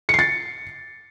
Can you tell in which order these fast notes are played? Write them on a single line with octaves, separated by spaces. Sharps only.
C#7 C7 A6